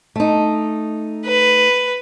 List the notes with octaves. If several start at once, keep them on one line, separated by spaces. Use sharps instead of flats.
A3 D#4
B4